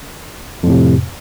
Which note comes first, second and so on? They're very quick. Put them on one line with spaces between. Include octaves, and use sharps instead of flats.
F2 A2 C3